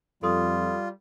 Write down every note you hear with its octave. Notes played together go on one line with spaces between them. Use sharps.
F2 G3 F4 A4 C6 D#6